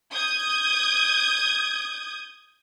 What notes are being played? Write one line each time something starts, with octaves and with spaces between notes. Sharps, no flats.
D#6 G6 G#6